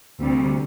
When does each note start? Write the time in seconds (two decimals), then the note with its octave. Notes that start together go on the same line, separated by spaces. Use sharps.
0.21 D2 C3 G3